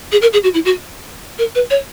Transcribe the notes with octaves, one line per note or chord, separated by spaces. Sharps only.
G#4
A#4
G#4
F#4
E4
F#4
A#4
B4
C#5